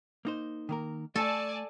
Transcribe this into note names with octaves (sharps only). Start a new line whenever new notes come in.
A#3 D#4 C5
D#3 A#3 A#4
A3 A4 D5 G#5 A5